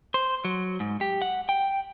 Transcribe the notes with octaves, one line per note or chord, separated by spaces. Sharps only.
C5
F#3
G#2
G4
F#5
G5